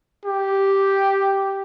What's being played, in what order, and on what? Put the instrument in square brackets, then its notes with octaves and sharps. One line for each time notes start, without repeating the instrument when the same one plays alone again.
[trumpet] G4